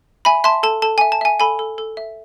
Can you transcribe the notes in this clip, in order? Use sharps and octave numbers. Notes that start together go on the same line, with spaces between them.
E5 G#5 B5
E5 A5 C6
A4 A5
A4 A5
E5 G#5
A5
E5 G#5
A4 G#5 B5
A4
A4
E5